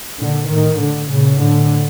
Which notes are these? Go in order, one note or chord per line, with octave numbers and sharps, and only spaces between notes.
A#2 D3
A2 D#3
A2 D3
A#2 C#3
A2 D3